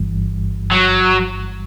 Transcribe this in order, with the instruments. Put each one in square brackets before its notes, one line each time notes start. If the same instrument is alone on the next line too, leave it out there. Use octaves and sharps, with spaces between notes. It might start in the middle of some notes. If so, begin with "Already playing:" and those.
Already playing: [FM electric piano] G1 G2 E3 G3
[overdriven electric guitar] F#3